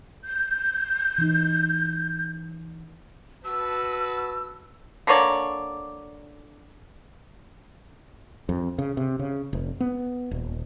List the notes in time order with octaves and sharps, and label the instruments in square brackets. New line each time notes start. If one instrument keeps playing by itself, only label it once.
[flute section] G6
[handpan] E3 D#4
[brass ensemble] F#4 B4 A5 [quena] E6
[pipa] D3 A#3 C#5 D5
[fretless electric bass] F2
C#3
C3
C#3
F1
B3
D#1